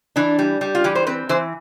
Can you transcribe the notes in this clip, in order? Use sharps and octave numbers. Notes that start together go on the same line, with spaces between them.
E3 D4
G3
G3
F4
E3 G4
C5
C4 B4
E3 C5